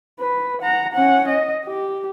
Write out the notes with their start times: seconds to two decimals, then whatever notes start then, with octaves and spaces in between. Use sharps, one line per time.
0.20 B4
0.62 F#5 A#5
0.93 C#4 F#5
1.28 D#5
1.66 G4